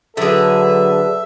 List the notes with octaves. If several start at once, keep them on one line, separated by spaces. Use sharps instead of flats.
D3 F#3 G#4 A4 B4 E5